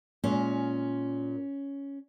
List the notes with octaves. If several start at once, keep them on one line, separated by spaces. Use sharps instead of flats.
A#2 G#3 C#4